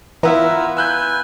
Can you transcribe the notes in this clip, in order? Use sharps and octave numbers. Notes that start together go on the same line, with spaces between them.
E3 B3 E4 F4 E5 F#5 A#5
B4 G#5 E6 F#6 G6